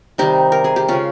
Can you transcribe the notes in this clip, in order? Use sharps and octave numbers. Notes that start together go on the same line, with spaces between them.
C3 D#3 G3 D#4 G4
A#4
G#4
G4
C#3 G#3 C#4 F4